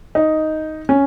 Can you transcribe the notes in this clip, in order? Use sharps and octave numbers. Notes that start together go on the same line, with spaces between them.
D#4
C#4